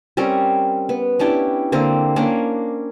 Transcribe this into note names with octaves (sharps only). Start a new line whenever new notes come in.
G3 C4 C#4 A#4
B3
C#4 D4 E4 G4
D3 A#3 C4
A#3 C#4 D4